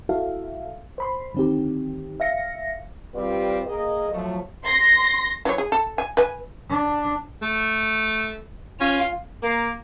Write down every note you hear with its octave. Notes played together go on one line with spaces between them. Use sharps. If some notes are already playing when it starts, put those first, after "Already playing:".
E4 F#4 A4 E5 F5
C5 B5 C6
D3 D#3 C4 D#4 G4
E5 F5 A#6 C#7
G3 C4 F4 G4 B4 D5
A#3 G#4 A#4 D#5
F3 F#3 A3
C6 A#6
E3 F#3 C#5
G#4
A4
G#5
B4 G#5
D4
A3
C#4 F4
A#3